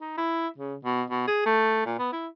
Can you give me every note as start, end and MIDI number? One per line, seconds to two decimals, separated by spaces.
0.01 0.16 63
0.18 0.47 64
0.58 0.75 49
0.85 1.02 47
1.10 1.25 47
1.28 1.44 68
1.46 1.82 57
1.86 1.95 46
1.99 2.09 59
2.13 2.27 64